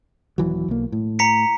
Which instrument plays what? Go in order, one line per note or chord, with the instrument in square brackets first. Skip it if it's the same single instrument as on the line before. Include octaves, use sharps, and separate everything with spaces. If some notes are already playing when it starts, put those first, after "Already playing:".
[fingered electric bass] D#1 E3 F#3
B1 A#3
A2
[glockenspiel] A#5 B6 C#7